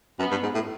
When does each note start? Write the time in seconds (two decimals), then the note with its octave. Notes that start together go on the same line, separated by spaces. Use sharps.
0.19 F#2 B3
0.31 G2
0.43 G#2
0.55 A2